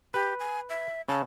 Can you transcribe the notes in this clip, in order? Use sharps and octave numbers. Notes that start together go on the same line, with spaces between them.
G4 B4
G#5
E5
C#3 A5